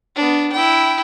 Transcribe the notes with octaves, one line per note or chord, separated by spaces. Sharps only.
B3 D4
E4 G5